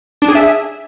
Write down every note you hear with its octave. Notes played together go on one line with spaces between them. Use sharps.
D4
G#4
E5